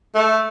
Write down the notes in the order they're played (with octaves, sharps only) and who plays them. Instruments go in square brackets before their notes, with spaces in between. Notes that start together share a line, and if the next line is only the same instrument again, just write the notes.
[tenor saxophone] A3